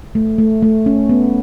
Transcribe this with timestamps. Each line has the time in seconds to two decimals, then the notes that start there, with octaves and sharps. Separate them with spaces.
0.15 A3
0.38 A3
0.63 A3
0.86 C#4
1.09 B3